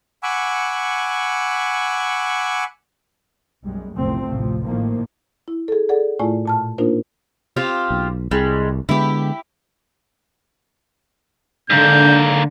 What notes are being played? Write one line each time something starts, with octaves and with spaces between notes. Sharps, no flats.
F#5 G#5 B5 C#6 D6 E6
B1 F#2 G3 G#3
F#1 C2 A#2 F3 A3 C4
A1 D2 C3 F3
A2 D#3 F3 A#3
E4
G#4 A4
G#4 A4 D5 F#5
A2 A3 E4 F4 D5 G#5
A#2 A5 F6
A#3 D4 D#4 F4 A#4 C5
C4 F4 G4
B1
C2 G3 G#3
D3 G#3 B3 E4 G4
G#2 D3 A#3 G6